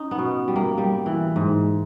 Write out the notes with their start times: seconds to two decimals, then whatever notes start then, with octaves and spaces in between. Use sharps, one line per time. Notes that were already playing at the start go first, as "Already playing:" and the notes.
Already playing: C#4 D#4
0.11 B3
0.18 B2
0.48 G3
0.56 A#3
0.78 G3
1.06 E3
1.36 G#2